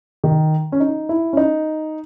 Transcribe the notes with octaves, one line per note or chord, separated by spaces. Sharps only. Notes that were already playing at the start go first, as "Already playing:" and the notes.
D#3
C#4
D#4
E4
C#4
D#4